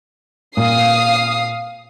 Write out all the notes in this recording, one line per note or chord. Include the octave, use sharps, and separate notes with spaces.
A#2 F5 D#6 C7